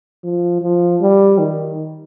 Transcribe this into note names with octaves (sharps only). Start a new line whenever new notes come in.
F3
F3
G3
D#3